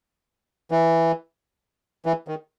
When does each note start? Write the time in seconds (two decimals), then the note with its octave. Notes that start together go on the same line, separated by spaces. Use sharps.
0.71 E3
2.06 E3
2.28 D#3